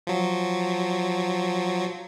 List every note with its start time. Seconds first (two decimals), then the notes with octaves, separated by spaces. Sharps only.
0.07 F3 F#3